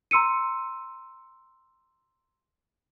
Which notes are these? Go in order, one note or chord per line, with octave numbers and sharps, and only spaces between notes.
A#5 C6 E6 C#7 D#7